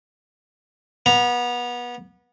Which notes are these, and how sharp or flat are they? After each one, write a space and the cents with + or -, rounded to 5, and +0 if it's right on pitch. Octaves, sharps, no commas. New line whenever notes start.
B3 -25 A#5 +0